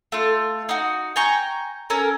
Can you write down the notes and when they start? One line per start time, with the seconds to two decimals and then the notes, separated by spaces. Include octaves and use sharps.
0.12 A3 F4
0.69 D#4 F#4
1.16 G5 G#5 A#5 C#6
1.90 C#4 A4 A#4